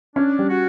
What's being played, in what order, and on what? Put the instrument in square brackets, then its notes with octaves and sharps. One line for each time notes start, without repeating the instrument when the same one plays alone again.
[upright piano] C#4 [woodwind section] D4
[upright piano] G3
[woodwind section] F#4